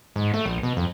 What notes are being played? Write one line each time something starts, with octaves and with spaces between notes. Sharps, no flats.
G#2
A3
A#1
B2
F2